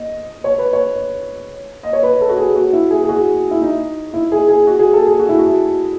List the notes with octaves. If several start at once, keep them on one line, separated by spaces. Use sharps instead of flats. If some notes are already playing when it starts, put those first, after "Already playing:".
Already playing: D#5
C#5
B4
C#5
D#5
C#5
B4
A4
F#4
G#4
F#4
E4
G#4
G#4
F#4
E4
D#4
E4
G#4
G#4
F#4
G#4
A4
G#4
F#4
E4
F#4